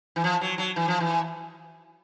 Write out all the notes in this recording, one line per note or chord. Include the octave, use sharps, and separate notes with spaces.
E3
F3
F#3
F#3
E3
F3
E3